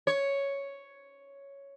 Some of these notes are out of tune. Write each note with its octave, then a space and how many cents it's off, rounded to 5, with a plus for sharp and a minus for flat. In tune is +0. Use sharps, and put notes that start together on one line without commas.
C#5 +5